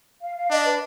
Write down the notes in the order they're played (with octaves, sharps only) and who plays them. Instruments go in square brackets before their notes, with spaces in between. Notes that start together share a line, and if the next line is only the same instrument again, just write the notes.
[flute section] F5
F5
[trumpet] D4 [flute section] D#5
[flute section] B4